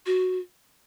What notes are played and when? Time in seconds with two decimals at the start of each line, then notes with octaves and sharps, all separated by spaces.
0.06 F#4